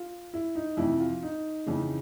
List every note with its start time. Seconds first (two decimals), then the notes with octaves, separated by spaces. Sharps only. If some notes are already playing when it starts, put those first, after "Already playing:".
Already playing: F4
0.34 E4
0.55 D#4
0.77 F2 C3 E3 E4
1.00 F4
1.23 D#4
1.66 F2 C#3 E3